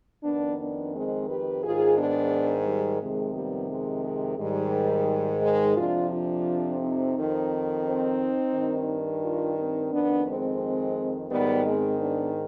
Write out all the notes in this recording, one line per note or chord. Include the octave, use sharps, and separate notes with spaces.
F2 D#3 B3 D4
B3 D4
G#3 C4
G4 B4
G#2 D#3 F4 G#4
B3 D4
G3
F2 C3 D#3 G#3
G3 B3
G#3
G#3
G#2 D#3 G3
G#3
F2 C3 F3 D4 F4
D4 F4
C4 D#4
F2 D#3
C4 D#4
G2 D#3
D4 F4
C4 D#4
F2 D#3 B3 D4
G#3 C4
G#2 D#3 G3 B3
G#3 C4
B3 D4